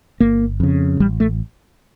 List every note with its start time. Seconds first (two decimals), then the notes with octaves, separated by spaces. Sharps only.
0.20 G1 A#3
0.60 F2 C#3
1.00 A1 G3
1.20 A3